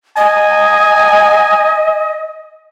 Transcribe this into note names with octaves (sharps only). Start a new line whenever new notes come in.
D#5 G#5